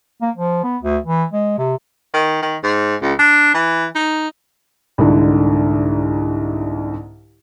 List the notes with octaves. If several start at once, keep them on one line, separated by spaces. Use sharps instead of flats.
A#3
F3
B3
D2
E3
G#3
C3
D#3
D#3
G#2
C#2
D4
E3
D#4
C2 G#2 D3